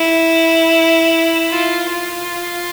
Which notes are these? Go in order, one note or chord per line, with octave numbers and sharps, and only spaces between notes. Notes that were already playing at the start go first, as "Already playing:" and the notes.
Already playing: E4
F4
F4